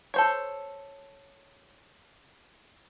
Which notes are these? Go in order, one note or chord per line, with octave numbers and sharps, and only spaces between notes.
A4 C5 C#5